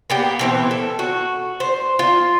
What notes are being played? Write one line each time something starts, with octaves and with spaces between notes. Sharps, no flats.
A#3 B3 G4
B2 E3 C4
A4
F#4
C5
F4